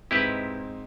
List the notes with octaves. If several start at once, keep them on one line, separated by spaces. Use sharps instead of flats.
G#2 C4 D#4 E4 G4 B4